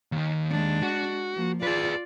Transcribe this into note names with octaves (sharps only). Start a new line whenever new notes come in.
D#2 D#3
G#3 D4
F#4
F3 A#3
F4 G#4 B4 D5